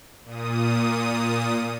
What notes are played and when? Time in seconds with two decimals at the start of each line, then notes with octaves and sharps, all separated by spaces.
0.25 A#2 D#6